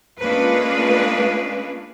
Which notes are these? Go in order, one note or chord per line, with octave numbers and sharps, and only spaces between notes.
G#3 A#3 C#4 D4 F4 B4